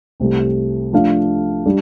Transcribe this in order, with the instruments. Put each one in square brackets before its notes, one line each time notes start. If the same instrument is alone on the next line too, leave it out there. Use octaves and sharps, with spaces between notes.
[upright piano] C2 C3 A3
F3 A3 D4 A4 F5
G3 D4